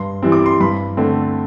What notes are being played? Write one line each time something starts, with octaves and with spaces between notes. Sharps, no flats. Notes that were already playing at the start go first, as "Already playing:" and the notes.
Already playing: G2 C6
E3 G3 C4
D6
C6
G2 B5
D3 A3 C4